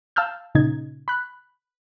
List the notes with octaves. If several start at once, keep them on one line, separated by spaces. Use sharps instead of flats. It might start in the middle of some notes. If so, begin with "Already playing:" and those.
F5 A5 E6 F6 G6
A#2 C#3 D#4 G#6
B5 F#6